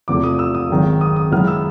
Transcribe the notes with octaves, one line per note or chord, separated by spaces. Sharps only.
E2 C3 F3 A3 D6
D#6
E6
D#6
G#1 F#2 D#3 G#3 C4
D#6
D#6
F#2 D#3 G#3 B3 E4 F6
E6